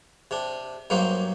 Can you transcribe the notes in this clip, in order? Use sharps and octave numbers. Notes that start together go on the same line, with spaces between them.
C3 D4
G2 F#3 A#3 D#4 C5